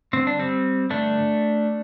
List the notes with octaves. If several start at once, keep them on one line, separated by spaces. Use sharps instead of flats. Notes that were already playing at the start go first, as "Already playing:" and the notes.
G2 D3 C4
D4
G3 C4
G2 D3 A3 D4